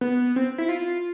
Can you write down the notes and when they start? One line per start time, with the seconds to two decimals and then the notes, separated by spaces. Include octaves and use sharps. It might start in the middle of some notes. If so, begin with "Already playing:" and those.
0.01 B3
0.36 C4
0.58 E4
0.69 F4